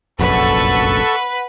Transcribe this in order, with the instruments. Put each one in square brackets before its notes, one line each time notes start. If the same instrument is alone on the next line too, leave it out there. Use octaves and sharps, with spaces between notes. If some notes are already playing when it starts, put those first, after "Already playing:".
[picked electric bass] F1 A#1 F#2 [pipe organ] A4 C#6 [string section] B4 [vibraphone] F#5